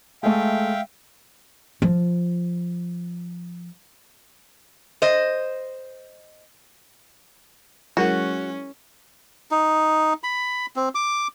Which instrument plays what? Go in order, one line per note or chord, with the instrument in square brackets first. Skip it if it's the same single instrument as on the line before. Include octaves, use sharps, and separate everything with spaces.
[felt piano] G#3 A3 [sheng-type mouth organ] E5 F5 G5
[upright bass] F3 F4
[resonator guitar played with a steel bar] C5 D#5
[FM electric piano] F#3 G#3 E4 [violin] C#4 [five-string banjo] F#4 [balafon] G#4 A#4 F#5
[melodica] D#4
B5
C4
D6